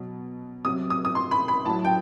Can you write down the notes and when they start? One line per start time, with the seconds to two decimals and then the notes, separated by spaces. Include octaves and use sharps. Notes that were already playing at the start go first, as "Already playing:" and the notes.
Already playing: B2 F#3
0.65 C3 F#3 D#6
0.90 D#6
1.05 D#6
1.15 C6
1.31 B5
1.48 B5
1.65 A2 F#3 A5
1.85 G5